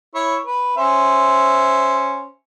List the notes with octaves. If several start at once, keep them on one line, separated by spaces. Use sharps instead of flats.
E4 C#5
B4
C#4 C5 E5